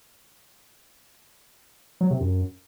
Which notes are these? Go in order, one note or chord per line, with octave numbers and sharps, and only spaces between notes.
F#3
C3
F#2